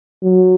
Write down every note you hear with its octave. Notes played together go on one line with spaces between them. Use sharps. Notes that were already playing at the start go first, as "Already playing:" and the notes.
F#3